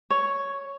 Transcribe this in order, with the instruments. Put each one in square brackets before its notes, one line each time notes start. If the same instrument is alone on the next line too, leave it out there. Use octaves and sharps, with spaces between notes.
[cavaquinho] C#5